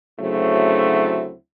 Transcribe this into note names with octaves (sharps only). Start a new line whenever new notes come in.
D2 C#3 F#3 A3 C4 E4